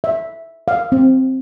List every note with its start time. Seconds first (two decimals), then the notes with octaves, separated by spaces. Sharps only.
0.04 E5
0.68 F5
0.92 C4